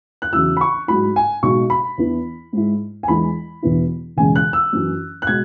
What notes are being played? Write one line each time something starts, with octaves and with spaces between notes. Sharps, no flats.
F#6
E2 C#3 F#3 E4 E6
B5
C#6
G#2 F#3 E4 B5
G#5
B1 B2 G#3 C#6
B5
E2 E3 B3 E4
G#2 G#3 E4
G#5
E2 E3 G#3 E4 B5
E1 E2 E3 B3 E4
E1 E2 C#3 G#3 G#5
F#6
E6
F#2 E3 C#4
F#6
B2 G#3 G#6